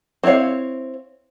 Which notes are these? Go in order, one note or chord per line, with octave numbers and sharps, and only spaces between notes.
C4 E4 F4 C#5 F5